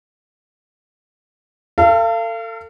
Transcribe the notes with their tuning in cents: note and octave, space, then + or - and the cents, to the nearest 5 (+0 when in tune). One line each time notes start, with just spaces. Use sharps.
A4 +35 F5 -35